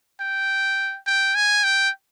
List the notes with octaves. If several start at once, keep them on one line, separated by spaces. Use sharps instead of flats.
G5
G5
G#5
G5